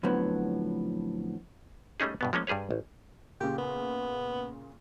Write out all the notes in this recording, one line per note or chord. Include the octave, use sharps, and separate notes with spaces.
F2 A2 D3 F3 F#3 B3
G3 A3 C#4 D#4 G#4
G2 B2 B3
F3 G#3 A#3 C#4
G2 G3 G#4 B4 C#5
A1
A#2 C#3 G4
B3